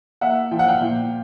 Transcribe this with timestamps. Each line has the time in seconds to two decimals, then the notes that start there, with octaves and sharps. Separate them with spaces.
0.21 A#3 E5 F#5
0.51 F3 G5
0.59 F#5
0.68 F5 G5
0.81 A#2